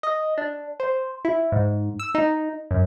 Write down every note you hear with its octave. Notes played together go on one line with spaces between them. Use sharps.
D#5
D4
C5
E4
G#2
E6
D#4
F#2